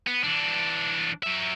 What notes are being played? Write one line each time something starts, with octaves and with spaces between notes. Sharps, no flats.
B3
E3 D4
F#3 E5